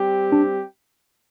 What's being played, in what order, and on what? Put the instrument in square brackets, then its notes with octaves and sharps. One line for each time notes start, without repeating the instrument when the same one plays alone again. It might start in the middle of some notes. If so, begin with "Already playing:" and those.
Already playing: [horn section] G3 C4 G4
[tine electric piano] D4